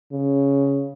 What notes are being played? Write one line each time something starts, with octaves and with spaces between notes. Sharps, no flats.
C#3